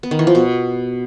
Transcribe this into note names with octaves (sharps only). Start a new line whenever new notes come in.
B3
D#3
E3
F3
B2